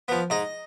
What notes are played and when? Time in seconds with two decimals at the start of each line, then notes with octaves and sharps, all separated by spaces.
0.08 F3 B3
0.30 G#2 D#5